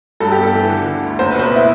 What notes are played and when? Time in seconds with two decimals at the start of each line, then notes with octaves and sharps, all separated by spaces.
0.20 G2 A4
0.32 G1 G4
0.43 A4
0.54 E3
0.70 D3
0.86 D3
1.02 D2
1.19 F#1 C5
1.31 B4
1.35 B2 C5
1.43 B4
1.56 E4